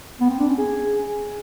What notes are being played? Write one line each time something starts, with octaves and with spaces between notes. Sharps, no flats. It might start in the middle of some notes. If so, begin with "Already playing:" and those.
B3
C4
D4
C#4
G#4